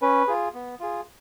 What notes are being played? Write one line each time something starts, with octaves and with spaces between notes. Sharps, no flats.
C#4 B4
F4 G#4
B3
F4 G#4